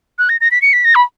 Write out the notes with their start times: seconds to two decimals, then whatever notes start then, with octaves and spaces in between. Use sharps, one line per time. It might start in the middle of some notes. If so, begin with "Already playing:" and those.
0.19 F#6
0.29 A#6
0.41 A#6
0.51 B6
0.62 C#7
0.73 B6
0.84 A#6
0.95 B5